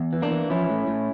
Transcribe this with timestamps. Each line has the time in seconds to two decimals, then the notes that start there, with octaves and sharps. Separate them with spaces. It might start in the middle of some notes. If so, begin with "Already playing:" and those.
Already playing: E2
0.13 E3
0.22 A#3 D4
0.31 E3
0.50 F3 C#4 E4
0.70 A2
0.88 A2